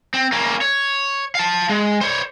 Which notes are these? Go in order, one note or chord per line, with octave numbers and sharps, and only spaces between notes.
C4
A#3 C#4
C#5
F5 A5
G#3
C5 C#5